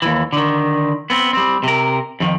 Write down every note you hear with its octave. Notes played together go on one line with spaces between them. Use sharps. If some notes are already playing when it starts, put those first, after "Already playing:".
D#2 E3
D3 D#3
B3 C4
G3 C4
C3 A#4
F2 D#3